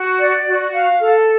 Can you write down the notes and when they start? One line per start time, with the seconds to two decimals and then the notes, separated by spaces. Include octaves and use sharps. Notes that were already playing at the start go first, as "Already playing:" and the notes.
Already playing: F#4
0.20 D5
0.47 F#4
0.74 F5
1.01 A4